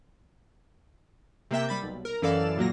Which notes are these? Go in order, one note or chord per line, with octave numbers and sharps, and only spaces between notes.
C3 A#3 E5 G5
G3 B5 A6
B1
A#4
F#2 E3 A4 D5 F5 E7
A#2 F#3 A#3 A#6